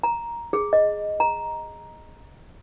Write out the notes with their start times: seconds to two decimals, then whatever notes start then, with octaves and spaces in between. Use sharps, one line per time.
0.03 A#5
0.53 G#4
0.73 D#5
1.20 A#5